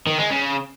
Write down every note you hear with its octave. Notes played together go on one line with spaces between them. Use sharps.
D#3
G#3
C#3